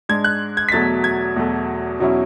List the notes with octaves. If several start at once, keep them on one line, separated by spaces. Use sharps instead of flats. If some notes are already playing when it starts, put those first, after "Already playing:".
G#2 G#3 D4 G#6
F#6
G#6
B6
E2 B2 F#3 A3 A6
G#6
E2 B2 F#3 A3
E2 B2 F#3 C#4 E4